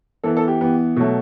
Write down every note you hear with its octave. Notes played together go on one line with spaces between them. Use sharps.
E3 B3 A4
A4
G4
E3 B3
B2 F#3 A3